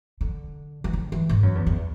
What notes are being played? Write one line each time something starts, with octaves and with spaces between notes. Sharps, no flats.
D3
E3
D3
E3
G#2
F#2
E2
E2